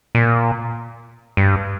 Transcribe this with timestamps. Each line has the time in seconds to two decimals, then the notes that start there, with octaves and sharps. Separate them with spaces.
0.15 A#2
1.37 G2